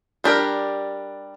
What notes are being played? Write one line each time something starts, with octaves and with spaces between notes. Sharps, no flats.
G3 D4 G4 A#4